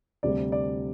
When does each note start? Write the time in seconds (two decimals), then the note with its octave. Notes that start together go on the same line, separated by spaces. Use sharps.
0.23 D2 C3 G3 D5
0.52 D5